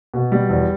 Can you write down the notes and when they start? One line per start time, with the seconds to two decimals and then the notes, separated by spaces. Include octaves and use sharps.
0.14 B2
0.32 G3
0.49 E2